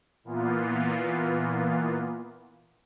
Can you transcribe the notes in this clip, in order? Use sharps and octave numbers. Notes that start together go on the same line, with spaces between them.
A#2 E3 A#3 B3 F4